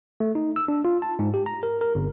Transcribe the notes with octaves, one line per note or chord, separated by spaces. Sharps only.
A3
D#4
E6
D4
F4
A5
G#2
G4
A#5
A#4
A#4
G1